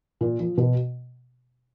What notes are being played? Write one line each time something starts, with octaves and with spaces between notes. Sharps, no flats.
A#2
F3
B2